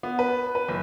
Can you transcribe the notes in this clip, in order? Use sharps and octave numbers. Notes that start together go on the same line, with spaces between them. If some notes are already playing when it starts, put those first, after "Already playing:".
B3
B4
B4
F#1